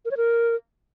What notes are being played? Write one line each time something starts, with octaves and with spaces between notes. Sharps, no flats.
A#4
C#5
A#4